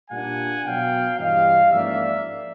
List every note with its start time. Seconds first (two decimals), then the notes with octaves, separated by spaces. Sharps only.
0.10 A#2 G3 A#3 D4 F#5 G#5
0.64 B2 F#3 B3 F5 G5
1.18 G2 E3 G3 D#5 F5
1.72 G#2 F3 A#3 C#4 D5 E5